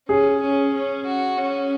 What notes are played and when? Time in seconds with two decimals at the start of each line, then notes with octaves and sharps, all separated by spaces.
0.08 C#4 G#4
0.41 C#4
0.73 C#4
1.05 F#4
1.38 C#4